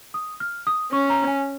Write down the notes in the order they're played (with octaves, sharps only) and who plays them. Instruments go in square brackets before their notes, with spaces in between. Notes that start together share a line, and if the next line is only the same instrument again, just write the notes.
[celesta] D#6
F6
D#6
[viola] C#4 [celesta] C#6
[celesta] A#5
G#5